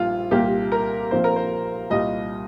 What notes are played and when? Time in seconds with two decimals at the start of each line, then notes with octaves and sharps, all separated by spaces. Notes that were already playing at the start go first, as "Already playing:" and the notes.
Already playing: A#1 A#2 G3 F4
0.31 C2 A#2 A#3 G4
0.72 A#4
1.11 A#1 A#2 F3 C4 C5
1.24 A#4
1.36 C5
1.90 C2 A#2 G3 D#5